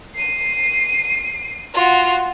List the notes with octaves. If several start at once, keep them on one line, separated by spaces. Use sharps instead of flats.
C7 D#7
F4 F#4